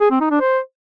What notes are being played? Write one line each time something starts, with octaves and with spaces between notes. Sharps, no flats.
G#4
C4
D#4
D4
C5